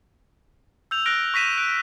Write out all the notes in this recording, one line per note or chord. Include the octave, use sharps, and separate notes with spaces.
E6 G6 F7
F6 F#6 A#6 D7 G7
C#6 A#6 B6 D#7 E7
F#6 D7